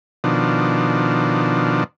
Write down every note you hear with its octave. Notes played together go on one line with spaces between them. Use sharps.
B2 D#3 F3 D4